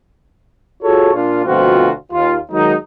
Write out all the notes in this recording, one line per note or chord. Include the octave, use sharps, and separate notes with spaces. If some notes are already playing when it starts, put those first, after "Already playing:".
F4 F#4 G#4 A4 C#5
A#2 D4 F4
D2 B2 F3 C4 F4 F#4
D#2 F4
D#3 F#3 G#3 D#4